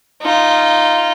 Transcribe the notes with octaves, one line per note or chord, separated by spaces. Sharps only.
D#4 F4